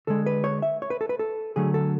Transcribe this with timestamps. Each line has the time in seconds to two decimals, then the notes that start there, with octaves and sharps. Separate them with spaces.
0.07 D3 G#3 A4
0.26 B4
0.44 C#5
0.62 E5
0.82 C#5
0.90 B4
1.01 A4
1.09 B4
1.19 A4
1.56 D3 F#3 A3 G#4
1.74 A4